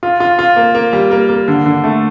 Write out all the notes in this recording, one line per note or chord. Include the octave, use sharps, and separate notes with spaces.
F4
F4
F4
A#3
A#3
G3
A#3
A#3
D3
D3
A3